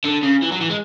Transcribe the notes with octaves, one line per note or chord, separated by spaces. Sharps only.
D3
C#3
E3
F#3
E3
G#3